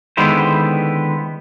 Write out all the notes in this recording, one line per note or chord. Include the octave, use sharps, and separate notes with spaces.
D3 D#3 G#3 B3 E4 C5